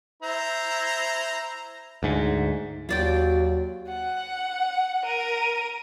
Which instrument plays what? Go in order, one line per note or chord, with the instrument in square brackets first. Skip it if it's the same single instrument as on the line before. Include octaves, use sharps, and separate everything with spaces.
[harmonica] E4 C5 A#5
[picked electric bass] D2 G#2
[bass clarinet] D#2 [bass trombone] F#3 [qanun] F4 D5 G5 [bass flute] F#4
[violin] F#5
A#4 D#7